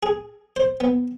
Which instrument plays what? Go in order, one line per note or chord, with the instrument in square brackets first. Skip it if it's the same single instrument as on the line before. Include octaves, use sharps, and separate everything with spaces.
[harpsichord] G#4
C5
B3